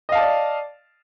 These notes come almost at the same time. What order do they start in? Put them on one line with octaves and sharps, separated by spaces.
D#5 F5 A5 D5